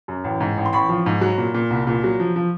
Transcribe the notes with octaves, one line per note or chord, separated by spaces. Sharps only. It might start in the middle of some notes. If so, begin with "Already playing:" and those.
F#2
A1
G#2
A1
C6
A1 B5 C#6
F3
G#2
F#3
A#2
A#2
C2
A#2
F#3
F3
F3